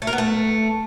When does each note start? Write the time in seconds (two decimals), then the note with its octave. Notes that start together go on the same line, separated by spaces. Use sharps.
0.02 A3
0.07 A#4
0.13 B3
0.18 A3